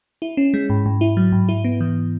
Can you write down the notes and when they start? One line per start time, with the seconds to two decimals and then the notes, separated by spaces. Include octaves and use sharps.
0.22 E4
0.37 C#4
0.54 G#3
0.70 G#2
0.86 G#2
1.01 E4
1.17 F#3
1.32 G#2
1.49 E4
1.65 B3
1.81 E3